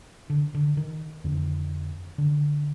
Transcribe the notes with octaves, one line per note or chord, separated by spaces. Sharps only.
D3
D3
D#3
F2 D3
D3